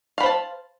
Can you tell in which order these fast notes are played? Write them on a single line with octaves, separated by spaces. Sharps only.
F5 B5 C5 A5